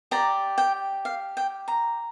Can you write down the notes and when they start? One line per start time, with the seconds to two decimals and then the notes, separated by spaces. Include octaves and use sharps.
0.11 G4 D5 A#5
0.58 G5
1.05 F5
1.37 G5
1.68 A#5